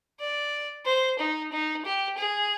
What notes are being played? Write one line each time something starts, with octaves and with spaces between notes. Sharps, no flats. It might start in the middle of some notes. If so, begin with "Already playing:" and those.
D5
C5
D#4
D#4
G4
G#4